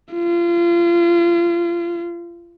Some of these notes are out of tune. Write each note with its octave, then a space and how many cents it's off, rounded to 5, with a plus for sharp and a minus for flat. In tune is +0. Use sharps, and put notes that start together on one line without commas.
F4 -30